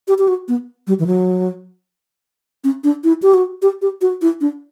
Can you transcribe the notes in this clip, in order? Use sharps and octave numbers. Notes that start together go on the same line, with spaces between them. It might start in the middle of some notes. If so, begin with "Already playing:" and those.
G4
G4
F#4
B3
G3
E3
F#3
C#4
D4
E4
G4
F#4
G4
G4
F#4
E4
D4